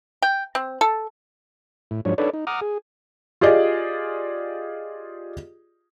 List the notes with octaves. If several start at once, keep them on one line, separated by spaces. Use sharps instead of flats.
G5
C4
A4
A2
G#2 F3 F#3 D4 C#5
D4 D#4 A4 B4 C#5 D5
D#4
F#5 A#5 D6 D#6 F6
G#4
F4 G4 G#4 D5 D#5